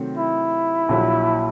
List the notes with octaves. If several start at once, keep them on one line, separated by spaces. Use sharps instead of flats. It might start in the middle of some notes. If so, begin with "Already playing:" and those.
Already playing: C3 D#3 F#3 A3 C4
E4
A#1 A#2 F#3